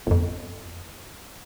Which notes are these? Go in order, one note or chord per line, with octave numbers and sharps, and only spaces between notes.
G1 F2